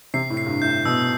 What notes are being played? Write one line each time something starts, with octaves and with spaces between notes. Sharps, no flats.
C3 C7
A2
C7
G2
A2 G6
B2 E6